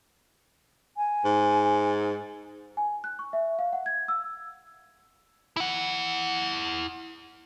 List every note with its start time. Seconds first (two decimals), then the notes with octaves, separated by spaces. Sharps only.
0.97 G#5
1.25 G#2
2.77 G#5
3.04 F#6
3.19 C#6
3.33 E5
3.59 F5
3.73 F#5
3.86 G#6
4.08 E6
5.57 E4 F#5